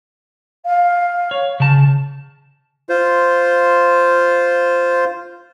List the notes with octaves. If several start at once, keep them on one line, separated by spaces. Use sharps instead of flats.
F5
C#5
C#3 A5
F4 C5